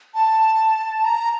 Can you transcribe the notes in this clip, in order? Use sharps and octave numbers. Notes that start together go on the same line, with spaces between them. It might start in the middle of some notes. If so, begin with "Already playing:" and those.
A5
A#5